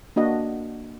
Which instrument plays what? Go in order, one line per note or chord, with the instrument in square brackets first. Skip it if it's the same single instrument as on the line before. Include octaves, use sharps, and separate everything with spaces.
[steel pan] A#3 D4 F#4 D#5 F#5